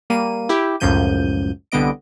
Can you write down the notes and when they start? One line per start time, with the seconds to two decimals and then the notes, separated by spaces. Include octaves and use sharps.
0.10 G3 A#3 D#7
0.49 E4 G4
0.80 C#2 F#2 A2 F3 G6 D#7
1.72 C2 D3 G3 B3 D#5 D7